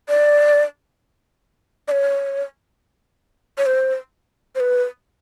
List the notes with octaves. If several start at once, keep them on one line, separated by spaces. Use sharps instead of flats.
D5
D5
C#5
C#5
C5
C5
B4